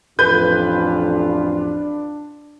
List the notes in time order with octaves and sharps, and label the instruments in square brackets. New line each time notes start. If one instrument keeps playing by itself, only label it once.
[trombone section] A1 F2 F4 [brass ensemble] D4 [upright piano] B4 [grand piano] G6